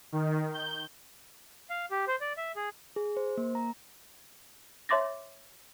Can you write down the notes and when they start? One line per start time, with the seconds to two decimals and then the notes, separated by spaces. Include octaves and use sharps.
0.12 D#3
0.54 G6
1.70 F5
1.91 G4
2.07 C5
2.21 D5
2.37 E5
2.56 G#4
2.96 G#4
3.17 C5
3.37 A#3
3.55 A#5
4.89 C#5 E5 C6 D6 A6 A#6